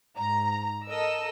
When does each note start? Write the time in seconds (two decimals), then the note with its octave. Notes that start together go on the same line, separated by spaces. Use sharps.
0.17 G#2 A#5
0.88 A4 A#4 D#5 E6